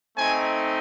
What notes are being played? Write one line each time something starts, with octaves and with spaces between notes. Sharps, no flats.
A3 C4 D#4 G#5